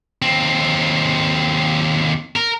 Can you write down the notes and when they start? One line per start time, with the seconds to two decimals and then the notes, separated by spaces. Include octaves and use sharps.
0.22 D#2 C4
2.36 A#4